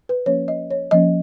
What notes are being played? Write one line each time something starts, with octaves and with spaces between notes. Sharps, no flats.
B4
F3 A#3 C#4 C#5
D#5
C#5
F3 A#3 C#4 D#5